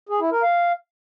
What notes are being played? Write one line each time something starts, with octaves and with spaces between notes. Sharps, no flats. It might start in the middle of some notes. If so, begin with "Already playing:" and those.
G#4
E4
A#4
F5